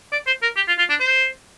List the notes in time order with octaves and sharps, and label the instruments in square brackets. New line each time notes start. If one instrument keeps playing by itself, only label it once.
[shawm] D5
C5
A#4
G4
F4
F4
D4
C5